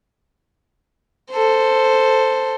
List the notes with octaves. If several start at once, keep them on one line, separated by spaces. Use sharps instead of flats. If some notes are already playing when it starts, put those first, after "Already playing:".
A4 C5